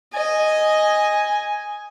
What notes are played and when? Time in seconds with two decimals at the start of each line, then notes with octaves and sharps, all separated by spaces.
0.14 D#5 G#5